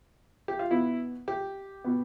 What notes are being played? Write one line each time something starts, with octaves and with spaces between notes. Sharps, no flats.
G4
F4
B2 B3 E4
G4
B2 B3